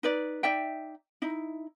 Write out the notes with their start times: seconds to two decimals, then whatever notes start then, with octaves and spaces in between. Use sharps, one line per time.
0.03 D#4 B4 D5
0.43 D#4 D5 E5 G5
1.22 D#4 E4